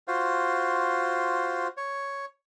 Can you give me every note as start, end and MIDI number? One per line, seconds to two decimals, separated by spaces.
0.08 1.68 65
0.08 1.68 66
0.08 1.68 72
1.77 2.25 73